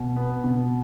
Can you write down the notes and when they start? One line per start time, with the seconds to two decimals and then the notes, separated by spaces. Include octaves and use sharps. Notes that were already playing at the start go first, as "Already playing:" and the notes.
Already playing: B2
0.16 B3
0.44 B2